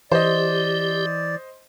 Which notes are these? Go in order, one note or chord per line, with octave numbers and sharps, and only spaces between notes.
E3 G4 C5 D5 D#5